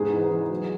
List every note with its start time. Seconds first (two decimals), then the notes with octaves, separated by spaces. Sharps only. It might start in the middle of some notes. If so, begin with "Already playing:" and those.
Already playing: E2 G#2 G#4
0.12 E3
0.31 E3
0.50 F#3